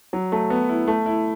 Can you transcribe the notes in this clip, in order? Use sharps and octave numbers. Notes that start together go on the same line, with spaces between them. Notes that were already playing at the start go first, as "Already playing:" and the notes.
F#3
A3
B3
E4
A3
E4